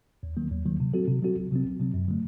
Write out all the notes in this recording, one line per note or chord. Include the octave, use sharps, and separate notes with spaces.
D#2
D#3 F#3 A#3
D#2
D#3 F#3 A#3
C3
F#3 C4 F#4 A4
C3
F#3 C4 F#4 A4
C2
C3 F#3 C4
C2
C3 F#3 C4
F#2
D3 F#3 A3